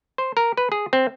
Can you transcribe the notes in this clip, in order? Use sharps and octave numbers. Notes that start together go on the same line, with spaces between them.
C5
A#4
B4
G#4
C4